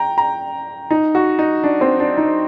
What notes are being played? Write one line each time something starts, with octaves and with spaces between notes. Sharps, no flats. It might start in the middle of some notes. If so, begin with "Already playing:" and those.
Already playing: G5 A#5
A#5
D#4
F#4
D#4
D4
C4
D4
D#4